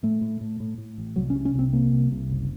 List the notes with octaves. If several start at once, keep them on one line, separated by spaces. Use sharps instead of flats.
A2 A3
A2
A2
A2
A2
A1
C2 F#3
C#4
C3
C#4
C2 C4
C3 A#3
C2
C2
F#1